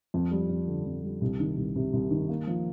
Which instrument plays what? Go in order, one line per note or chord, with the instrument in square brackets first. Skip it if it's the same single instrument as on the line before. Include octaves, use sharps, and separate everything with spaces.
[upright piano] F2
G3
F2
D3
F2
G3
C2
D#3
C2
C3
C2
D#3
A#3
F3